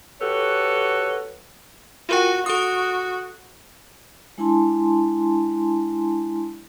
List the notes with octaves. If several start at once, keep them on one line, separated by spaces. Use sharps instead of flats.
F#4 G4 A4 B4 C#5
F4 F#4 A#4 G5
F#4 A4 D#6
G#3 D4 E4 G#5 A5 C6